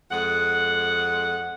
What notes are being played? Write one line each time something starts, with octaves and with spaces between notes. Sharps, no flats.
F2 G#3 F#5